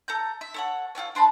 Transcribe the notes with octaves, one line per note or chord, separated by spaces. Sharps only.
A4 A#5 G6
E5
A4 C#5 F#5
F4 G4 A4 C#5
D4 C5 A5 B5